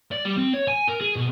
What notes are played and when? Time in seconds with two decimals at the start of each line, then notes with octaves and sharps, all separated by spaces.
0.12 D5
0.25 G3
0.38 C4
0.54 C#5
0.68 G#5
0.88 A#4
1.01 G#4
1.16 B2